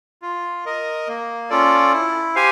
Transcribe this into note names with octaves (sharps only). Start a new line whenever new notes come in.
F4
A#4 D#5
A#3
C#4 F4 A4 D5
E4
G4 C5 F5 G#5